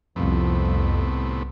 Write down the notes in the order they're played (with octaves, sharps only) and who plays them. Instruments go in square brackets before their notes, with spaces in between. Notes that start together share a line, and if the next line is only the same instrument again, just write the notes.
[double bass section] C2 [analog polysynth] F2 [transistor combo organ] A2 C3 B3